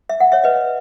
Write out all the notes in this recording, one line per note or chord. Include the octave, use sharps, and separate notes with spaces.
E5
F#5
C#5 E5
B4 D#5